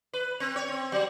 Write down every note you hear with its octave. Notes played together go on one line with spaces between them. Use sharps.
B4
C4
C#5
C4
F#3